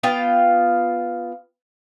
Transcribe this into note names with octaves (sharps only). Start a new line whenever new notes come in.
B3 F4 F5 G5